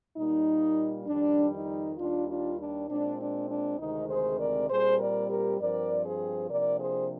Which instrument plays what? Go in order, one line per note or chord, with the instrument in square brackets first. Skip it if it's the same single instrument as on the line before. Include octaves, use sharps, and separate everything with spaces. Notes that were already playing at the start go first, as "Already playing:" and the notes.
[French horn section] A#2 G3 A#3 D#4
F2 D#3 G3 D4
D#4
D#2 D#3 G3 D4 F4
D4 F4
D4
A#2 G#3 C4 D4
D4
D4
D2 C3 D#3 G#3 C4 D#4
G#4 C5
A#4 D5
A#2 G3 C4 G#4 C5
A#4 D5
G4 A#4
G2 F3 C4 A#4 D5
G#4 C5
C3 F3 A#3 D4 A#4 D5
G#4 C5